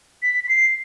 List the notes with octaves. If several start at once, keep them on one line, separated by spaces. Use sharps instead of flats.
B6
B6
C7